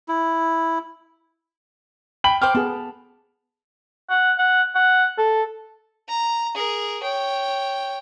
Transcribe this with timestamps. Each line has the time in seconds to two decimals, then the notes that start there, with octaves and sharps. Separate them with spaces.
0.09 E4
2.24 G5 B5 F#7
2.42 C5 G5 D6 F6
2.55 B3 G#4 A4
4.10 F#5
4.38 F#5
4.76 F#5
5.18 A4
6.09 A#5
6.55 G#4 A#4
7.03 C#5 G5